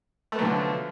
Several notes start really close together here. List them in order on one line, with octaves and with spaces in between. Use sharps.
A3 B3 F#3 D3 F3